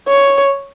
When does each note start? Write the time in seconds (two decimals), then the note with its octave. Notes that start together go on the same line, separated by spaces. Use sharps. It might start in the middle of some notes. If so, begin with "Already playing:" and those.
0.08 C#5